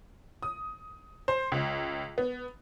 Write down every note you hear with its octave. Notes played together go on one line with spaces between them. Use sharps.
D#6
C5
C#2
B3